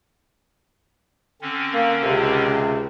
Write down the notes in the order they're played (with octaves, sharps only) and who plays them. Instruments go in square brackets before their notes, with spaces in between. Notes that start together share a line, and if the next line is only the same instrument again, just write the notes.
[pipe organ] D3 C4 C#4
[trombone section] A#3
C#2 C3